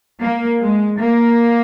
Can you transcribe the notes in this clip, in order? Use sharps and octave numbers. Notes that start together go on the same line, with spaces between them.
A#3
G#3
A#3